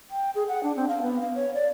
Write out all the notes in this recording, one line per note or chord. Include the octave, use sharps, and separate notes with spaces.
G5
G#4
F#5
D4
C4
F5
B3
F5
C#5
D5